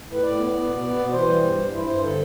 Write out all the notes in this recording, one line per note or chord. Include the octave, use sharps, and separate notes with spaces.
A2 B4
A2 D5
B3
B3
B2
B3
B2
E3 C5
G3
G2
G2
G2 E4
G2 C5
D3 A4